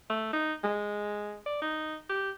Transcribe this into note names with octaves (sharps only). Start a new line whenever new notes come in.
A3
D#4
G#3
D5
D#4
G4